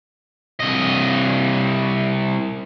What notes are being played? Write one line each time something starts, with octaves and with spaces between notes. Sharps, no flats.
C2 D#5